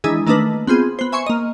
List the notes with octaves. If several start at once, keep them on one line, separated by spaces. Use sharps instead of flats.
D#3 E3 G#3 D4 E4 G#4
D#3 A3 A#3 D4 D#4 B4
B3 C4 F4 G#4
B3 C5
E5 G#5 C6 C#6 C#7
A#3 D#5